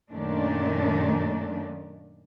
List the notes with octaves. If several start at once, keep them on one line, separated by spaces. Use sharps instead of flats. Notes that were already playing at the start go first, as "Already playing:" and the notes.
F#2 A#2 D#3 A3 C#4 D4